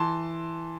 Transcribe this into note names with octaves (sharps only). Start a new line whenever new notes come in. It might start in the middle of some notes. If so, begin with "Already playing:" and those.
Already playing: E3 A5 C6